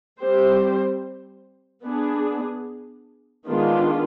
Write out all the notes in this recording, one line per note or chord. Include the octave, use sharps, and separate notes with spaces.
G3 C4 G4 C5
B3 D4 G#4
D#3 G#3 B3 D4 F4